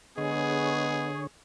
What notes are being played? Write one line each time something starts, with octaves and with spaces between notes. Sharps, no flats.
D3 G#3 B3 G#4 C#5